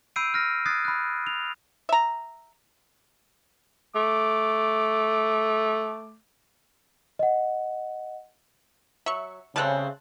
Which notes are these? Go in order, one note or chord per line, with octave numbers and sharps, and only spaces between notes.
B5 E6 G6 C7 D7 D#7
F6 A#6
D#6 F#6 G#6 A6 C7
B5 F#6
F7
E5 A#5
A3 D6
D#5 F#5
F#3 E5 C#6
C#3 G3 A3 C4 A5 F#6